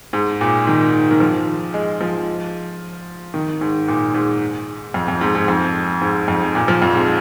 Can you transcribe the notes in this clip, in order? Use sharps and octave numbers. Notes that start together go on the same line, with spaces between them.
G#2
A#2
D#3
D#3
F3
G#3
F3
D#3
G#2
A#2
G#2
F2
F2
G#2
G#2
F2
G#2
F2
A#2
F3
F2
G#2